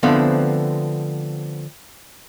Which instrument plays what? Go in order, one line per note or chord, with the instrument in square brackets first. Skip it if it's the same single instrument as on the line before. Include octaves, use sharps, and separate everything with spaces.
[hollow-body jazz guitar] D3 F3 A3 B3 C4